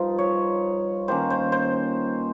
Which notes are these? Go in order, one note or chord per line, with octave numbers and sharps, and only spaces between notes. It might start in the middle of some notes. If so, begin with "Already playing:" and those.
Already playing: G2 F3 D#4 F4
C#5
D#3 A#3 C#4 C5
C5
C5